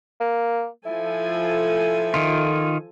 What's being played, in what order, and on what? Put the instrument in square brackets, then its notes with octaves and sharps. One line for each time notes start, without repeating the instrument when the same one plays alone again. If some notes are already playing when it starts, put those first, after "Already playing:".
[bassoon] A#3
[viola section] F3 A4 G#5 [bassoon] E4
[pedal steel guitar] D#3 F4